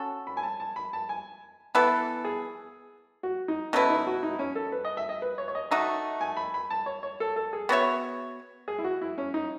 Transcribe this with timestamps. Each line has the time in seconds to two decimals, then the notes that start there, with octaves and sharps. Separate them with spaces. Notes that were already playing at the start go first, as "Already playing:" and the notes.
Already playing: C#4 F#4 A4
0.27 B5
0.37 G#5
0.43 A5
0.60 A5
0.76 B5
0.93 A5
1.09 G#5
1.75 E3 B3 E4 A4 B4
2.25 G#4
3.23 F#4
3.48 D#4
3.73 B2 A3 C#4 E4 B4
3.90 D#4
4.07 F#4
4.23 D#4
4.39 C#4
4.55 A4
4.72 B4
4.85 D#5
4.97 E5
5.09 D#5
5.22 B4
5.38 C#5
5.48 C#5
5.55 D#5
5.71 A3 D#4 F#4 E5
6.21 G#5
6.37 B5
6.54 B5
6.70 A5
6.86 C#5
7.03 C#5
7.20 A4
7.36 A4
7.53 G#4
7.69 B3 F#4 C#5 E5
8.68 G#4
8.78 E4
8.84 F#4
9.01 E4
9.18 C#4
9.34 D#4